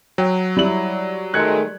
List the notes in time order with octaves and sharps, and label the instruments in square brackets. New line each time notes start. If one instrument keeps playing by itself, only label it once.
[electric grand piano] F#3 [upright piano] G5
[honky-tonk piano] G3 [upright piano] E4 F#7
[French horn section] D#3 G#3 A3 [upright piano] F#6 G#6 C#7